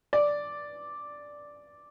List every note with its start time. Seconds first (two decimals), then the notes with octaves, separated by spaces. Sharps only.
0.13 D5